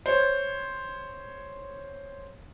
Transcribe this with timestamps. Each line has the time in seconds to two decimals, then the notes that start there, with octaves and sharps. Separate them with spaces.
0.06 C5 C#5